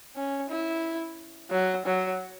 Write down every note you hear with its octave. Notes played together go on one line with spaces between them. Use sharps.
C#4
E4
F#3
F#3